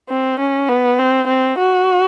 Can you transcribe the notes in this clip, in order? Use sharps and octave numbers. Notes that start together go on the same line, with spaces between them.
C4
C#4
B3
C4
C4
F#4